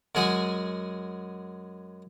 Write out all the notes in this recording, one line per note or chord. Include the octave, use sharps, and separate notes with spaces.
F#2 G#3 G#4 F#5 G#5